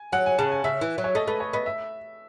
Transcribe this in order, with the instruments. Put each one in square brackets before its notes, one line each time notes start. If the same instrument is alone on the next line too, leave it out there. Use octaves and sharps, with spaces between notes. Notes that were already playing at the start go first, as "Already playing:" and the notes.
Already playing: [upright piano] G#5
[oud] F#3 [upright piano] F#5
[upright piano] G#5
[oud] C#3 [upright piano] A5
[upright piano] G#5
[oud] C#3 [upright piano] E5
[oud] E3
F#3
[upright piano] C#5
[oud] A3 [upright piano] D#5
[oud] A3 [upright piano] B4
[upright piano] C#5
[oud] B3 [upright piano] D#5
[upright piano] E5